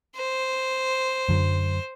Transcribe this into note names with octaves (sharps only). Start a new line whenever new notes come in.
C5
F#2 D3 F#3